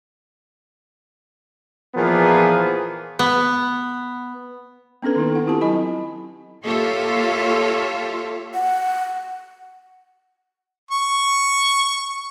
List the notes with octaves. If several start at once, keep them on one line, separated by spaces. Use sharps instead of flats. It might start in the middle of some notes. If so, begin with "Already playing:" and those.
A#2 E3 F3 B3 G#4 A#4
B3
B3 C#4 D4 A4 B4
D#3 A#3 D#4 E4 A4
E4 F#5
C4 E4 F4 G4 A4 A5
F#3 E4 D#5 G#5 B5
A#3 F4 G4 A4 C#5 E5
F#5
C#6